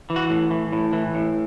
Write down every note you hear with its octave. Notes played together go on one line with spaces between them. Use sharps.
E3
F#4
A2
E3
A2
E3
A2